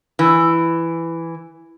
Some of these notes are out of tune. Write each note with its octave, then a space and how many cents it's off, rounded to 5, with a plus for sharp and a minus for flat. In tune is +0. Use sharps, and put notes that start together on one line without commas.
E3 +10